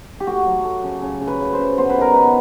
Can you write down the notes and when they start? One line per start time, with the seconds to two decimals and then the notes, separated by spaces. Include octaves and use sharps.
0.20 G4
0.26 A3 F#4
0.46 F#3
0.64 A3
0.84 C#3
1.02 C#3
1.21 C#3
1.27 B4
1.40 C#3
1.53 C5
1.58 C#3
1.78 B3 C5
1.89 B4
1.96 D#3 A#4
2.14 B3 B4